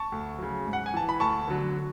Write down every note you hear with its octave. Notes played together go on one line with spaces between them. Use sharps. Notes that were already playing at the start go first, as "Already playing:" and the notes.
Already playing: A5 C#6
D2
C#3 F#3
G#2
F#5
G#5
E3 A5
B5
D2 A5 C#6
D3 F#3